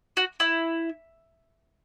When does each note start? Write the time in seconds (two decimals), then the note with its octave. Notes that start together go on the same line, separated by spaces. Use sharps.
0.17 F#4
0.40 E4